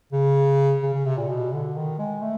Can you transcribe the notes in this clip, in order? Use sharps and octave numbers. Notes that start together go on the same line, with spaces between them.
C#3
C#3
C#3
C3
A#2
B2
D3
D#3
G#3
A3